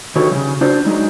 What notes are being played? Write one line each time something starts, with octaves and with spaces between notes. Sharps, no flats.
D3 D#3 F#4 G4 B4 C#5
C#3 E3
D4 F4 F#4 C5 D5
F#3 G#3 D#4